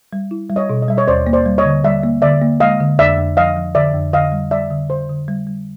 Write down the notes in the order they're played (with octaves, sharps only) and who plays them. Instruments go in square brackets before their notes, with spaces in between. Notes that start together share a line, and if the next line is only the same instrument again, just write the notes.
[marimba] G3
E4
G3
[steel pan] C#5 D#5
[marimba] B2
[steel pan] D#5
[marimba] G3 [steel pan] E5
[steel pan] C#5 D#5
[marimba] D#2 [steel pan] C5 D5
[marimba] A#3
[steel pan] C5 D5
[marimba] G3
[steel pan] C#5 D#5
[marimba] D3
[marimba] G3 [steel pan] D5 E5
[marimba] A#3
[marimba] D3 [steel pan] D5 E5
[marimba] A#3
[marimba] G#3 [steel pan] D#5 F5
[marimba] D3
[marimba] F2 [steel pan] D5 E5
[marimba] F2
[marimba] F3 [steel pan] D#5 F5
[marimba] F3
[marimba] D3 [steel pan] D5 E5
[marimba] F2
[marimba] D3 [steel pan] D#5 F5
[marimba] G3
[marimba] G3 [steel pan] D5 E5
[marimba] D3
[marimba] D3 [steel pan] C5
[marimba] D3
G3
G3